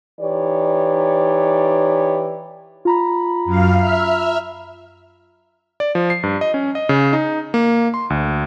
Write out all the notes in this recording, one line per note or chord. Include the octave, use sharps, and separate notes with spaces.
E3 D#4 G4 C#5 D5
F4 A#5 B5
F#2 F5
E5 F6
D5
F3
C7
G2
D#5
C#4
D#5
C#3
D#4
A#3
C6
D2